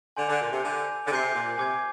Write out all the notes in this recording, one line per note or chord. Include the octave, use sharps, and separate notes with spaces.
D3 G#5 C6 G6 D7 F7
D3
A#2
C3
D3 G#5 D6 G6
D3
C3 G#5 D6 G6 C7
A#2
C3 G#5 D6 G#6